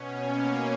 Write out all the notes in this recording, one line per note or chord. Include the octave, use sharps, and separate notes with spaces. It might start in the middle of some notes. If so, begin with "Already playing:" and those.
Already playing: B2 C#4
A#3